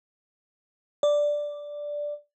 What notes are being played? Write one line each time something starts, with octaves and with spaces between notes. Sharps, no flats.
D5